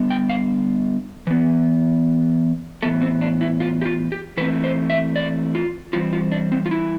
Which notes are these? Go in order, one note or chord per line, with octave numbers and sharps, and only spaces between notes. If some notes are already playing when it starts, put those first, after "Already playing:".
Already playing: D3 G3 B3
G5
F5
E3 B3
A2 E3 B3 A4
C4
D4
E4
F4
G4
F4
G4
E3 A3 C4 B4
C5
E5
D5
F4
E3 G3 C4 F4
F4
D4
C4
F4
E4